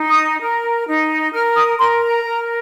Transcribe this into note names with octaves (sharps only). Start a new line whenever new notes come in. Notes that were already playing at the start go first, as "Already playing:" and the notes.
Already playing: D#4
D#6
A#4
D#4
A#4 F6
D#6
A#4 C6
A#5
A#4